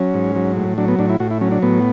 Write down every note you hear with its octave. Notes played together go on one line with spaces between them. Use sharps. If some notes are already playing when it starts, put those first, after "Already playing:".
Already playing: F#3 C#4
G#2
F#3
A2
F#3 D4
B3
A2 D4
E4
A2 F#4
E4
F#3 C#4
D4
A2 B3